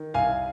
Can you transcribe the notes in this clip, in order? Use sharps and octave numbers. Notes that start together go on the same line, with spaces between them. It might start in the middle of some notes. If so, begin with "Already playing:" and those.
Already playing: D#3
C2 F5 G#5